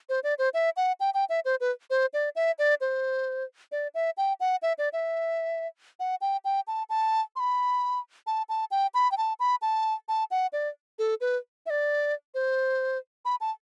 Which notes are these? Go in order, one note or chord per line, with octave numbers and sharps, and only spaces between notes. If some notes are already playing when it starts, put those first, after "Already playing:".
C5
D5
C5
E5
F#5
G5
G5
E5
C5
B4
C5
D5
E5
D5
C5
D5
E5
G5
F#5
E5
D5
E5
F#5
G5
G5
A5
A5
C6
B5
A5
A5
G5
B5
G5
A5
B5
A5
A5
F#5
D5
A4
B4
E5
D5
C5
B5
A5